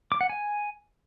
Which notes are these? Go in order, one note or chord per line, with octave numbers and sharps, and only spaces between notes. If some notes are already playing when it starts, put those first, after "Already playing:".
D6
F#5
G#5